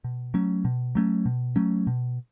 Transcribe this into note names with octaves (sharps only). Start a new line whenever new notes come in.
B2
F#3 A3 C#4
B2
F#3 A3 C#4
B2
F#3 A3 C#4
B2